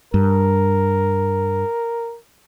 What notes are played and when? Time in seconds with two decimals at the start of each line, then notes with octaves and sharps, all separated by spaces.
0.14 G2 A#4